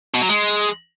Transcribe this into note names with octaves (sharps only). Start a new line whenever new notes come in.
B2
F#3
G#3